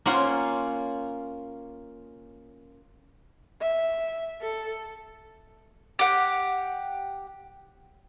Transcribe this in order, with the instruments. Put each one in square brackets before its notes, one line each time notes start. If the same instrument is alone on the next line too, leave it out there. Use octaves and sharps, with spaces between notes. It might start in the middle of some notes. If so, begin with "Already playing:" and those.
[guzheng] A#3 C#4 F4 F#5 C6
[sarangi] E5
A4
[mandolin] G4 F#5